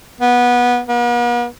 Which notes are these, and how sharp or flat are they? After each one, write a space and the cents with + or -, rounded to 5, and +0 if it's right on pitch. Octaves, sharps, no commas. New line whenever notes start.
B3 -15
B3 -45